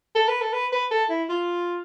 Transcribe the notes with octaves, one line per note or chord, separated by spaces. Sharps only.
A4
B4
A4
B4
B4
A4
E4
F4